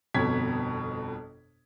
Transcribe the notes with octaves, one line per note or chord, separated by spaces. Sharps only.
G1 F2 B2 G#6 B6